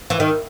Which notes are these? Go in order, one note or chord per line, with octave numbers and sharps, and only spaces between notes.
E3
D#3